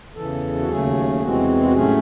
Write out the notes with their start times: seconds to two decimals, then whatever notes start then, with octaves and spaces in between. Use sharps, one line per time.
0.15 E2 C#3 E3 A4
0.60 F#4
0.68 D#2 C#3 F#3 A3 G#4
1.21 E2 C3 E3 G#3 C4 F#4
1.63 F#4
1.74 A2 F#3 A3 C#4 G#4